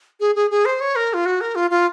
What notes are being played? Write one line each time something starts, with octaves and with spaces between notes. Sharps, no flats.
G#4
G#4
G#4
C5
C#5
A#4
F4
F#4
A#4
F4
F4